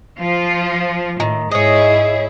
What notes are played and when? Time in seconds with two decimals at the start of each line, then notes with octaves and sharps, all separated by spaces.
0.19 F3 F4
1.20 A2 D#3
1.51 G#2 E4 G#4 C#5 D#5